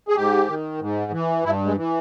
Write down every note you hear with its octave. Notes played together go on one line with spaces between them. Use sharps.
G#4
G#2 G4
D#3
G#2
E3
G2 E4
G#3
E3